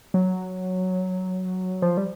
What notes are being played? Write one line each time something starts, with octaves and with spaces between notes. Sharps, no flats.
F#3
F3
G3